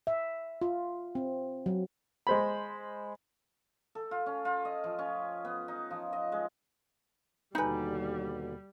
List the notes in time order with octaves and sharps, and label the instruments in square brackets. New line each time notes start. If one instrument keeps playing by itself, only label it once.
[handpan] E5
F4
C4
F#3
[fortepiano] G#3 C5 B5
[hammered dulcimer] A4
F4
C#4
F4
D#5
F3
C#4
B3
D#4
F3
D#5
G#3
[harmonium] D#2 B2 D3 [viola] G3 [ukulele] D#4 B4 [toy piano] C#5 G#5